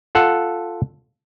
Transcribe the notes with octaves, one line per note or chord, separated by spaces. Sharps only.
F4 A4 F#5